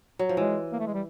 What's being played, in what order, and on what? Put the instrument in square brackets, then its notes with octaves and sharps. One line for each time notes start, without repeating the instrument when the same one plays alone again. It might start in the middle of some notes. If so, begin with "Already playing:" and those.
[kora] F#3
F3
[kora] E3 [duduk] G#3
[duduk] A#3
A3
G#3
G3